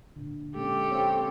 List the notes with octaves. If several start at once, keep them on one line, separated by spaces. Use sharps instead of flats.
A#2 D3
G#3 A#3 C#4 G4 A4
C4 C#5 F5